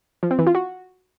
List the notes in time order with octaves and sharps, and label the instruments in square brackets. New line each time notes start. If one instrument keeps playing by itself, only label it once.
[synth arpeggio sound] F3
C4
E3
F4
F#4